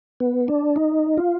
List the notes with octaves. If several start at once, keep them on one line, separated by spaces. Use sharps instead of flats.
B3
D4
D#4
F4